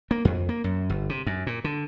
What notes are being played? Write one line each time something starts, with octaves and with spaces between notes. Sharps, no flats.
A#3
F2
A#3
F#2
G1
C3
F#2
A#2
D3